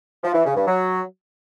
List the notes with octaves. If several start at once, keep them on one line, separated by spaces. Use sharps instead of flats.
F3
E3
C#3
G2
F#3